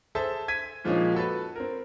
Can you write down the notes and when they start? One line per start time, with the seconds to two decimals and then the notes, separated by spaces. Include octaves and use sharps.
0.15 G#4 A4 C5 E5 A5
0.48 G#6 B6 D#7
0.85 A#2 F3 G#3 A#3 C#4 D#4
1.14 F#4 A4 B4
1.56 C4 A#4